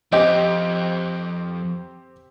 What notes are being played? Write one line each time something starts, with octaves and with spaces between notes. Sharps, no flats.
F2 C4 G4 D#5